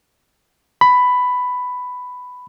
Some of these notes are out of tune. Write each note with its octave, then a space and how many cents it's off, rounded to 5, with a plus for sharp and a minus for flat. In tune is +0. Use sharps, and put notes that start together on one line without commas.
B5 +10